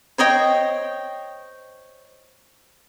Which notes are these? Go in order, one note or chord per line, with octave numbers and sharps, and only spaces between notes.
C5 C#5 D#5 G5